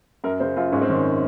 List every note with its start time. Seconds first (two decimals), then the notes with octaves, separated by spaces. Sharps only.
0.24 F#2 A#4
0.40 C#3 C5
0.56 F#2 F4
0.72 G#2 C#4
0.81 C4
0.89 D#3 C#4